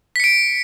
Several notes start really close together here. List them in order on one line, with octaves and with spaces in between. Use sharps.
B6 C#7 D7